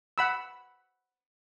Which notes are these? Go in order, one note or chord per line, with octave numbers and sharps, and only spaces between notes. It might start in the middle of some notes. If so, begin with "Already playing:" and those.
F#5 B5 E6